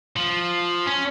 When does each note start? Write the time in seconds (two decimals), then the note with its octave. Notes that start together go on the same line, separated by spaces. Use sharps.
0.16 F3
0.86 C#4